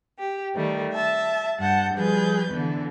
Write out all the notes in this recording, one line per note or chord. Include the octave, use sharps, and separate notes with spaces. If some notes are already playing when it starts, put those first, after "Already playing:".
G4
D#3 G3 A3
E5 A5
G2 F#5 A5 G6
F3 G3 G#4 B4 G6
D3 E3 B3